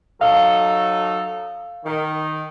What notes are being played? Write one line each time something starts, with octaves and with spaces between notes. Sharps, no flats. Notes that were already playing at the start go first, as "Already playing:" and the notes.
F#3 D#4 A4 F5
D#3